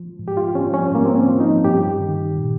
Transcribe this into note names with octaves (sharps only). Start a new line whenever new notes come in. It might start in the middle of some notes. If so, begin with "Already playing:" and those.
Already playing: F3
G#2
G4
F4
F3 C#4
C#4
G#2 A#3
C4
C#4
F3
D#4
G2 G4
D#3
A#2